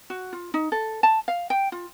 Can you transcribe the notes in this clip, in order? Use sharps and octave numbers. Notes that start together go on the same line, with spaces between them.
F#4
F4
D#4
A4
A5
F5
G5
F4